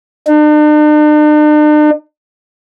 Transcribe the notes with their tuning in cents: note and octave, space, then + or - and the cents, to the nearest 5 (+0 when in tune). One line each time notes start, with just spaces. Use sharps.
D4 +45